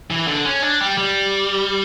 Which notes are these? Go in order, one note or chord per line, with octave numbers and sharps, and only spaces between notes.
E3
D3
C#4
D4
G3
G3